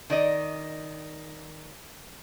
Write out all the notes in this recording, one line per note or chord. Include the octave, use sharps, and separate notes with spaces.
D#3 D5 D#5